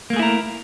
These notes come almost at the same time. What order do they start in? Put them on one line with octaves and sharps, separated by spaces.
A#3 A3 G#4 E4 A#4